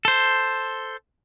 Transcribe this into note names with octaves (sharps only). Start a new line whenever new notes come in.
A4 C5